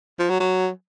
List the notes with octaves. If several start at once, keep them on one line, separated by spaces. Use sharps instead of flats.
F3
F#3
F#3